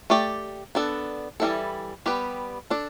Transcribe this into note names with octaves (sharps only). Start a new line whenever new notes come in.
A3 G4 D5
B3 D4 A4
E3 G3 E4 A4
G3 B3 G4 B4
D4 A4 D5